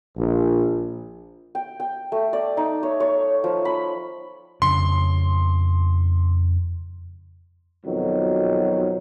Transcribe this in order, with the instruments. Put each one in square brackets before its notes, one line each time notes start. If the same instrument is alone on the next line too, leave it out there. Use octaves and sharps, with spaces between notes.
[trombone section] A#1
[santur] G5
G5
A3
D5
D#4
C#5
C#5
F3
B5
[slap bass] F2 C#3 D4 [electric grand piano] C6
[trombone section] F2 B2 D#3 F#3